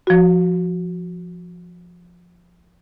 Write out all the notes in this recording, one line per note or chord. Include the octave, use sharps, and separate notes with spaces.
F3 F#4